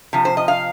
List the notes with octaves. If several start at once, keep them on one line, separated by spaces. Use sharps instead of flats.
C3 F3
C5
D#5
F5